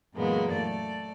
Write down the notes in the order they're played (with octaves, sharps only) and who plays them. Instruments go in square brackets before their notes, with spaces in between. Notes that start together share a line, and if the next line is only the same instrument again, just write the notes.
[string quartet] F#2 A#2 E3 G#3 A#3 B3
A3 D5